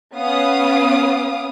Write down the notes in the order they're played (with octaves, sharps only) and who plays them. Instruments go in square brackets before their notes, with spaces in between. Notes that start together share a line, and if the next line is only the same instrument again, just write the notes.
[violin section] B3 C#4 F5 D#6